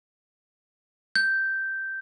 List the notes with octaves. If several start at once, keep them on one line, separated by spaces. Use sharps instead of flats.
G6